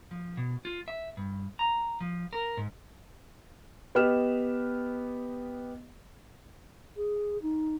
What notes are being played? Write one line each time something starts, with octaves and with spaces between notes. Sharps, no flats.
F3
B2
F4
E5
G2
A#5
F3
A#4
G#2
B3 G4 B4 D#5 F6 E7
G#4
D#4